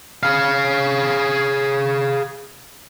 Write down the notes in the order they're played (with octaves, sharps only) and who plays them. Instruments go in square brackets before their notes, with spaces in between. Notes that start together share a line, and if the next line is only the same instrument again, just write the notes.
[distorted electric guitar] G#4 F5